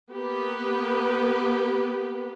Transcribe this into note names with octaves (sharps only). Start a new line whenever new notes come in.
A#3 B3 G4 B4